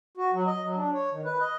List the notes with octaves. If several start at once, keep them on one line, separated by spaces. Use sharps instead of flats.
F#4
F#3
D#5
F#3
D4
C#5
D#3
B4
D#5